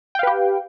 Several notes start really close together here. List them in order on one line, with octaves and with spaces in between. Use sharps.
G5 F5 B4 G4